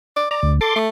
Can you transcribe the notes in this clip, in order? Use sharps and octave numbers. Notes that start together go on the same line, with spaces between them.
D5
D5 A#5
D2
A4 C6 D6
A3